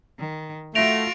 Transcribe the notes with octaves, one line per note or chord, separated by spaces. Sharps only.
D#3
A3 F4 F#4 A#6 D7 F7